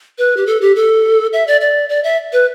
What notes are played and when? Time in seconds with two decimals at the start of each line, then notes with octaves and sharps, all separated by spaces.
0.18 B4
0.37 G4
0.47 A4
0.61 G4
0.76 A4
1.33 E5
1.47 D5
1.61 D5
1.89 D5
2.04 E5
2.33 B4